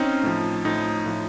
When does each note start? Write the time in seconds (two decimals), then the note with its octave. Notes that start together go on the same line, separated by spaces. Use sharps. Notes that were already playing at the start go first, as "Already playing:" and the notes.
Already playing: C4 C#4 D#4
0.23 A2 F3
0.65 A2 F3 D#4
1.06 A2 F3